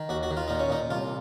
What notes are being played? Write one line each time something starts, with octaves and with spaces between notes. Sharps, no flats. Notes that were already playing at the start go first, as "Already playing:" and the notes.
Already playing: D#3
D#2 F#4
F#4
D#3
F4
A#2 D#4
C#4
A#2 D#4
C2 F4